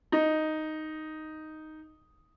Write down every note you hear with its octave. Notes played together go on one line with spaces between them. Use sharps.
D#4